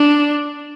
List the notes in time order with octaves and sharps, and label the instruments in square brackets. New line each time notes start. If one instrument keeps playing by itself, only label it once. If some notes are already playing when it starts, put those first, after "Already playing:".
Already playing: [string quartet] D4